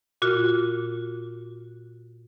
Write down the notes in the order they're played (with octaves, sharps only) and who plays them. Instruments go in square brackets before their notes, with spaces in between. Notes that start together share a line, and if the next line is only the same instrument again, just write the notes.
[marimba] A#2 F4 F#4